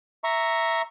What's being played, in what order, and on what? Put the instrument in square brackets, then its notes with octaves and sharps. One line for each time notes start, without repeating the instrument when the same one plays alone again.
[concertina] E5 A#5 C#6